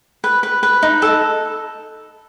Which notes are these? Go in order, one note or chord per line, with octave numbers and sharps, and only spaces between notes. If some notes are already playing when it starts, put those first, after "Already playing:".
B4
B4
B4
D#4
A4